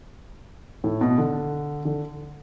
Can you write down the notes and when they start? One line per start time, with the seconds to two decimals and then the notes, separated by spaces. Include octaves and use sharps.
0.84 A2
1.01 B2
1.18 D3
1.85 D3